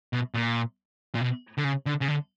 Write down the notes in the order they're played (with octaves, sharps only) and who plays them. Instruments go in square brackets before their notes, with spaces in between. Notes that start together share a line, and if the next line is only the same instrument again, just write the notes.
[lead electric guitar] B2
A#2
A#2
B2
D3
C#3
D3
C#3
D3